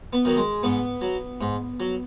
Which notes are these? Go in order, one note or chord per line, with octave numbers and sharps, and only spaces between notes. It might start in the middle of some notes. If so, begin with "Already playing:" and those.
B3
D#3 F#3
G#3
G#2 B3
F#3
G#2
F#3